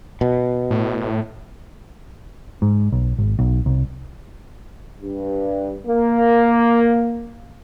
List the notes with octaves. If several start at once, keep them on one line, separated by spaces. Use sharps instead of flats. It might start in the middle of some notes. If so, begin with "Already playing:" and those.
B2
A2
G#2
B1
G#1
B1
C2
G2
A#3